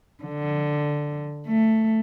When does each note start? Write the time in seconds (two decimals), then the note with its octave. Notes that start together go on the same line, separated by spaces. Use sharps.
0.24 D3
1.47 A3